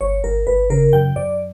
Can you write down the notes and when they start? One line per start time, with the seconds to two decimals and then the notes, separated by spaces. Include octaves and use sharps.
0.01 G1 C#5
0.24 G1 A#4
0.47 G1 B4
0.70 C#3 A#4
0.93 F#2 G5
1.16 F#2 D5